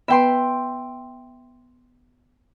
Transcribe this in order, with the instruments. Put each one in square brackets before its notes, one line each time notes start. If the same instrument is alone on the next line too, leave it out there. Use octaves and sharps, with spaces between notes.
[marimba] B3 B4 [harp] E5 G5 C6